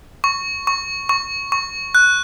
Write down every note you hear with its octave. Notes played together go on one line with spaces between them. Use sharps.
C#6
C#6
C#6
C#6
F#6